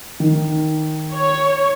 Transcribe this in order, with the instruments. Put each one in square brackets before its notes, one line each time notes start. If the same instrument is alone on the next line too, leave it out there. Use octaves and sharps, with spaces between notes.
[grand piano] D#3
[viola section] C#5